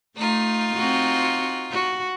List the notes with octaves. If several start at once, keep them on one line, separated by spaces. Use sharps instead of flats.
A3 D#4 F4
C4 F#4
F#4